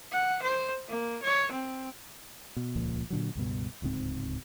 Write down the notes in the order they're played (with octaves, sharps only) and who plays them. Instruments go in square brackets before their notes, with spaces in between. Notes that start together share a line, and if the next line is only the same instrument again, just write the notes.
[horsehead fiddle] F#5
C5
A#3
C#5
C4
[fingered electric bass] B2
D#1 C#2 A#2 F3
A#2 D3 F#3
C#2 G2 B2
D1 C#2 G#2 C4